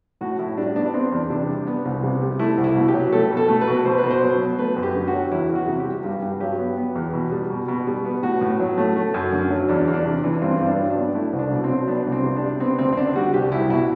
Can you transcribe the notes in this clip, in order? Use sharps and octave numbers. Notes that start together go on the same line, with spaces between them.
A2 F#4
A2 E4
G3 D4
B3 D4
D4
B3 C4
E2
C3 D4
G3
B3
C2
C3
G3
A3 E4
C2
E4
B2
G4
F#3
A3 A4
B2
A4
A3
B4
B2
B2 C5
B4
B2
C5
F#3
B3
A3 B4
F#2
G4
D3
F#4
F#3
E2 E4
E2
F#4
C3
G4
G3
G2
G2
F#3 G4
B3
B3
E2
B2
G3
B2
B2
G3
B3
A2 F#4
A2
F#3
A3
A3
F#2
D3
F#3
E2 D4
E2
D4
C3
E3
G2 C4
G2 C4
D4
F#3
D4
B3
A3 E4
C2
D4
B2
C4
F#3
B3 D4
C2
C4
C3
D4
G3
B3 C4
D2 C4
C4
D3 D4
G3 F#4
C2 G4
C2 E4
B2 E4